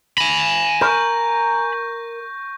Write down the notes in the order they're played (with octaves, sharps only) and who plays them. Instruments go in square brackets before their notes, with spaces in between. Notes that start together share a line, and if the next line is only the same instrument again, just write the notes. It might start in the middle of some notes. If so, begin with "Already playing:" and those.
[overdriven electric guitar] G#5 B5 [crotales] A#6
[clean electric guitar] A#4 [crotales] C#6 G6